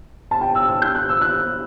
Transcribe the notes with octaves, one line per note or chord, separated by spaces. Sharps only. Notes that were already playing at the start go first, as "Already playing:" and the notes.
A5
G5
E6
E6
G6
F#6
E6
F#6